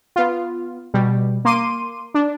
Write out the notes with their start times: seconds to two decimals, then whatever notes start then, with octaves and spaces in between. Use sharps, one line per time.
0.16 B3 F4
0.94 B2 G3
1.45 A#3 C6 D6 D#7
2.14 D4